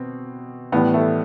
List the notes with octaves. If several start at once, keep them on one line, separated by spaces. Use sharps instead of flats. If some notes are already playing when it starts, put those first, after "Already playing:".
Already playing: B2 C4
A2 E3 G3 B3
A3